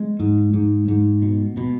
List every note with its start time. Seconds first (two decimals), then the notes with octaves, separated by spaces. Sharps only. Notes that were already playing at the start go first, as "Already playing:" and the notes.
Already playing: G#3
0.20 G#2
0.53 G#2
0.88 G#2
1.22 B2
1.57 B2